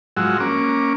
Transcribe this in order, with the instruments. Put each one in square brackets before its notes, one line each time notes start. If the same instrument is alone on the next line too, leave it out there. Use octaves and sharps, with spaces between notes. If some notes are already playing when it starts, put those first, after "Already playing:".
[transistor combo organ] G#2 F3 F#3 G#3 F#4 E6
A#3 C#4 D6